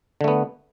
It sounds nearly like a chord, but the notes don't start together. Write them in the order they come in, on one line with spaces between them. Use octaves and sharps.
D3 A3 B3